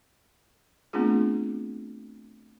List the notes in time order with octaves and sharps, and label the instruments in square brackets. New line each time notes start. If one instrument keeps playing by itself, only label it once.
[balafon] A3 B3 C4 D4 F4 G#4